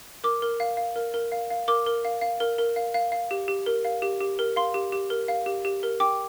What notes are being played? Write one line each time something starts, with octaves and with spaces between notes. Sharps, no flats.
A#4 D6
A#4
F5
F5
A#4
A#4
F5
F5
A#4 D6
A#4
F5
F5
A#4
A#4
F5
F5
F5
G4
G4
A#4
F5
G4
G4
A#4
F5 C6
G4
G4
A#4
F5
G4
G4
A#4
G5 D6